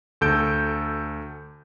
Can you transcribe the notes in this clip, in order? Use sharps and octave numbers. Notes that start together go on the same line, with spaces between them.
D2 A4 G6 D7